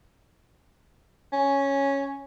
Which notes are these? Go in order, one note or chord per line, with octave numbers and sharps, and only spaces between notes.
C#4